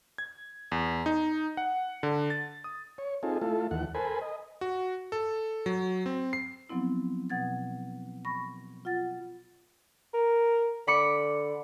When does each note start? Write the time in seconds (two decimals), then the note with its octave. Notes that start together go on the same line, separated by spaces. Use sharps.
0.18 G#6
0.72 E2
1.06 D#4
1.57 F#5
2.03 D3
2.30 A6
2.64 D#6
2.98 C#5
3.23 C4 D#4 F4 G#4 A4
3.42 A3 E4 F4 A4
3.71 D#2 E3 F#5
3.94 A4 A#4 C5 G#5 B5
4.21 D#5
4.61 F#4
5.12 A4
5.66 F#3
6.06 C4
6.33 C7
6.69 F3 F#3 B3 C4 E4
7.30 B2 F#5 G#6 A6
8.25 B5 C#6 A#6
8.85 F4 F#5 A6
10.14 A#4
10.88 D3 B5 D6 C#7